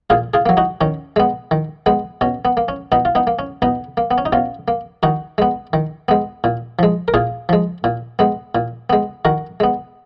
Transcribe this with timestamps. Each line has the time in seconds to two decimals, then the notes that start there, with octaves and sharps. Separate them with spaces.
0.10 A#2 F4 G#4
0.34 F4 G#4
0.46 F#3 A#3
0.57 D#4 F#4
0.81 D#3 C#4
1.16 G#3 B3
1.51 D#3
1.86 G#3 B3
2.21 B2 C#4
2.45 B3
2.57 A#3
2.68 C#4
2.92 B2 B3 D#4
3.05 F4
3.15 B3 D#4
3.27 A#3
3.39 C#4
3.62 B2 B3 D#4
3.97 A#3
4.11 B3
4.18 C#4
4.26 D#4
4.32 B2 C#4 F4
4.68 A#3
5.03 D#3 D#4 F#4
5.38 G#3 B3
5.73 D#3
6.08 G#3 B3
6.44 A#2
6.79 F3 G#3
7.08 A#4
7.14 A#2 F4 G#4
7.49 F3 G#3
7.84 A#2
8.19 G#3 B3
8.55 A#2
8.90 G#3 B3
9.25 D#3 F#4 A#4
9.60 G#3 B3